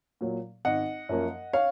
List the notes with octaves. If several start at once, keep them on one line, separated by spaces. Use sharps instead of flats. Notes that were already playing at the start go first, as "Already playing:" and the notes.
A#2 F#3
G#1 D#5 F#5
F#2 F3 A#3 C#4
C#5 F5